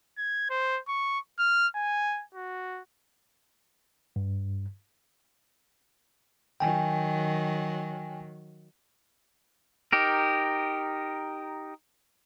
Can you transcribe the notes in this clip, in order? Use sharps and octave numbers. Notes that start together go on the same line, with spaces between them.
G#6
C5
C#6
F6
G#5
F#4
G2
D#3 F#3 G5 G#5
D#4 G4 A#4